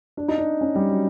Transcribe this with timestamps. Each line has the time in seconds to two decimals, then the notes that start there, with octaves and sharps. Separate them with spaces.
0.17 D4
0.28 D#4
0.38 D4
0.61 C#4
0.75 G3
0.89 F#3